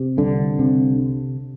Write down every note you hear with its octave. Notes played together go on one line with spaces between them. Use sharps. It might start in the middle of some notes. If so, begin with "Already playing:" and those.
Already playing: C3
C2 D3
C3